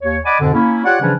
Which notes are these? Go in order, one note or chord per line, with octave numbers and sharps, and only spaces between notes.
D#2 C#5
D5 D#5 F#5 G#5 B5 D6
F2 G#2 B2 D3
A#3 C#4 E4
F4 G4 C#5 D5 F#5
C#3 E3 F3 G3 C#4 D4